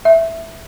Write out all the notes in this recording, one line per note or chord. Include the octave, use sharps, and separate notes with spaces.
E5